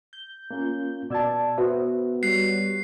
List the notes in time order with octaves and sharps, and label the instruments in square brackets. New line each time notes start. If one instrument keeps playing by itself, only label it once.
[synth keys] G6
[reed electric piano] A#3 C#4 F4
[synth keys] B2 A5 [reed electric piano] D5 E6 G#6
[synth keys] B3 F#4 [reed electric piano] C5 E5
[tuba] G3 [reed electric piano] C#5 F#6 [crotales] C7